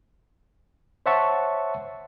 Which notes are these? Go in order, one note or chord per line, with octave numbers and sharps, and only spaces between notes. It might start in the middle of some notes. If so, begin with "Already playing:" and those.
C5 C#5 E5 F#5 A5 C#6